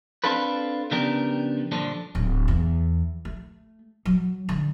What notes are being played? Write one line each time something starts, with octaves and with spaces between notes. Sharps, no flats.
C4 D4 F4 A4 B4
C#3 F3 B3 D4 G4 A#4
G2 A#2 D3 F3 D4
D1
E2
A3
F#3
D3